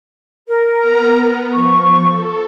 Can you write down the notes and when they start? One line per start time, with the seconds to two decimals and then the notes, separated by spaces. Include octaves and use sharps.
0.48 A#4
0.79 B3 A#5
1.17 B3
1.54 F3 C#6
2.09 A4